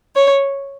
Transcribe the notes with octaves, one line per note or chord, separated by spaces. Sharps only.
C#5